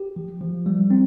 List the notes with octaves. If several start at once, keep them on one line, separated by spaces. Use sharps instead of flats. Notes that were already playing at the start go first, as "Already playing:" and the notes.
Already playing: G4
F3
F3
G3
C4